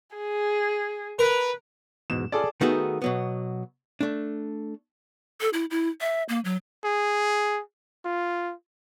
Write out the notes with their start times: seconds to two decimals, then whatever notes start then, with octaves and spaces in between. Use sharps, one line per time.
0.16 G#4
1.19 A#4 B4
2.10 E2 G#2 B2 E7
2.32 C#4 F4 G#4 A4 D5
2.61 D#3 A3 B3 D#4 F#4 G#4
3.02 B2 F#3 B3
4.01 A3 D4
5.41 A4
5.53 E4
5.71 E4
6.01 E5
6.29 A#3
6.44 F#3
6.85 G#4
8.05 F4